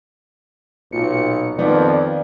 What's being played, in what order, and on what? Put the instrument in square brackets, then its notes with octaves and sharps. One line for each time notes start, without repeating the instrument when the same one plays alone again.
[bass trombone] B1 [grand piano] A#2 [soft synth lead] C#7
[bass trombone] F2 [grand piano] D#3 B3 B4 [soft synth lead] D5